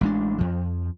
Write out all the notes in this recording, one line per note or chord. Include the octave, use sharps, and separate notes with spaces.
A1 G#3 D4
F2 F3